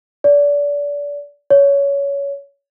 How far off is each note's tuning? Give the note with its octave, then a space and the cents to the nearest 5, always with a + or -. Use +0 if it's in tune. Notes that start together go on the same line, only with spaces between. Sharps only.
D5 -30
C#5 +20